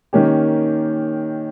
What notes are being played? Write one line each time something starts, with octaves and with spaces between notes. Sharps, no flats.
D#3 A#3 C#4 G4